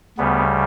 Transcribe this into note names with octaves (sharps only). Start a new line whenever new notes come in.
D2 C#3 G3 B3